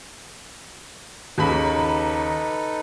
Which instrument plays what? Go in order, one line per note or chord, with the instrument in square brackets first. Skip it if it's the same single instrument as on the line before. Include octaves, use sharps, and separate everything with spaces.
[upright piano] D#2 C#3 B5 [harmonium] D#4 A4 B4